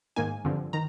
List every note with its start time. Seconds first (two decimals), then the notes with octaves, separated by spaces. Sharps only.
0.16 G#2 D#3 A#3 D#4 G#5
0.45 G2 D3 F3 C4
0.73 D#3 A#5